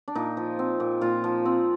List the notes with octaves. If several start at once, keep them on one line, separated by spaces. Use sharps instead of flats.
D4
A#2 D#4
F3
C4
A#2
A#2 F4
F3
C4